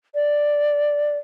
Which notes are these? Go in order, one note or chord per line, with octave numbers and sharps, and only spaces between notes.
D5